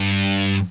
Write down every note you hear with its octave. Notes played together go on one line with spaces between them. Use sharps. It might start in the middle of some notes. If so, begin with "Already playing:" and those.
Already playing: G2